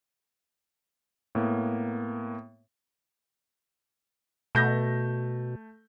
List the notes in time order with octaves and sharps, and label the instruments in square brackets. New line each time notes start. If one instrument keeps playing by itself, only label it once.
[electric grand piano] A2 A#3 B3
[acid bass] B2 [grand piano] A3 G6 A#6